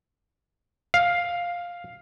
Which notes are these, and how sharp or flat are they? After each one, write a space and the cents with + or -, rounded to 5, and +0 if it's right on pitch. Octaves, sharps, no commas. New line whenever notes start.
F5 +5